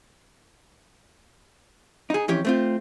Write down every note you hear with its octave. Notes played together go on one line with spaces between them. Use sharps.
D#4 G#4
F2 E3 C#4 G4 C#5
A3 C4 F4